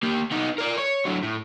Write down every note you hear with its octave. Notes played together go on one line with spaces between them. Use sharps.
A#3 G4
B3 D#4
A#4 D5
C#5
D3 F#3
A2